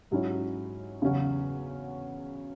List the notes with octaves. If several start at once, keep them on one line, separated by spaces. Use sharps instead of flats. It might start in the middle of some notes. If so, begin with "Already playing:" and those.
G#2 F#3 C#4 E4
E2 C#3 F#3 C#4 F#4